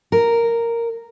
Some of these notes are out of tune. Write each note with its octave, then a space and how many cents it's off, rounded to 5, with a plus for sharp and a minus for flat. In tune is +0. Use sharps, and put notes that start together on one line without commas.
A#4 -5